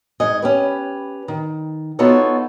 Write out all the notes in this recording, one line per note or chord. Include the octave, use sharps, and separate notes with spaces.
G#2 D#5 G#5
C#4 G4 B4
D#3
B3 D#4 F4 F#4 A4 C#5